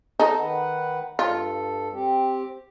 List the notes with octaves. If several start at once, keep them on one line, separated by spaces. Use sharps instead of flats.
D#4 A4
D#3 B4 F#5
G2 F4 A4
C4 G4